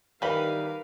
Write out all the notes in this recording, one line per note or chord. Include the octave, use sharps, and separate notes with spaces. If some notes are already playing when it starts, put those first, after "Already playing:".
D#3 E3 G3 A#4 B4 F5 B5